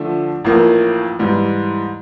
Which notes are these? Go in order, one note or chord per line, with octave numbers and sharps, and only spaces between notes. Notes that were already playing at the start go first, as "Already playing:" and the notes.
Already playing: D3 F3 A3 D4
A1 A2 F3 A#3
G#2 E3 G3